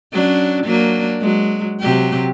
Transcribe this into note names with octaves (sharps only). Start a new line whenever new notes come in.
F#3 C#4 D4
F#3 A#3 D4
F#3 G#3
C3 F#3 G4